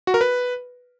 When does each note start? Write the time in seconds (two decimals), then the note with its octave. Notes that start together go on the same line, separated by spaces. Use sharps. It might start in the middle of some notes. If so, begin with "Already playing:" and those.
0.07 F#4
0.14 A#4
0.21 B4